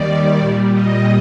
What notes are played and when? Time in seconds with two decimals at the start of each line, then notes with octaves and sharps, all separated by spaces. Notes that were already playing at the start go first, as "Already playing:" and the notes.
Already playing: D#2 D#3 G3 D5
0.38 A#2 G3
0.71 D#5